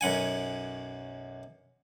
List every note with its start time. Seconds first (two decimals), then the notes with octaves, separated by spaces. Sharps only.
0.01 B1 F#2 F#5 G#5